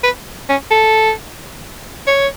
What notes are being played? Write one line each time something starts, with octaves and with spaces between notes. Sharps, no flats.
B4
C#4
A4
C#5